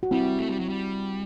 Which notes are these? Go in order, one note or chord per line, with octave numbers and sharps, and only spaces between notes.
F#4
G3 C4 E4
A3
G3
F#3
G3